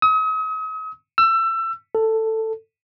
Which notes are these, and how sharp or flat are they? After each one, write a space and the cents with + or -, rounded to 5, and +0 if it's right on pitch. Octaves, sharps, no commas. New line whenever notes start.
D#6 +40
E6 +25
A4 +10